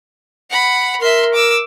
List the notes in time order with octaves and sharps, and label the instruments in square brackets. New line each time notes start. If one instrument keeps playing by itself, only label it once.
[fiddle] F#5 B5
[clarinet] A#4 [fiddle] E5 C6
[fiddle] D6 E6